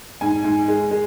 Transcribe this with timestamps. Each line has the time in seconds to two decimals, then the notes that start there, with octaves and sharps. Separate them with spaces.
0.21 G#2 G#5
0.44 G#2
0.68 G#3
0.91 G#3